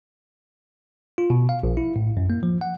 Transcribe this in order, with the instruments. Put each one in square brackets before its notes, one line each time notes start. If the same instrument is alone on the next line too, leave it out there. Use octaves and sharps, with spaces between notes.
[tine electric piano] F4
B2
F5
A#1
E4
A2
F#2
A#3
F3
F#5